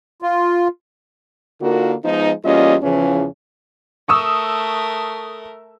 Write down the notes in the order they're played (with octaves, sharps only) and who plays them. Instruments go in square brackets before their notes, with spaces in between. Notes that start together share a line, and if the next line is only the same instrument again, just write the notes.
[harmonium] F4
[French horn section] D3 A#3 D#4 F4 F#4 A#4
F3 G#3 B3 D#4
E2 G3 A#3 C#4 F4 D#5
E2 C#3 E3 F3 C#4
[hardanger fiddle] A3 A#4 [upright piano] C#6 D#6 E6